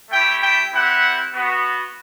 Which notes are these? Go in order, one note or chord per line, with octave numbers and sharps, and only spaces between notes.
A3 E4 G4 G5
G5
C4 E4 G4 F#5
B3 F#4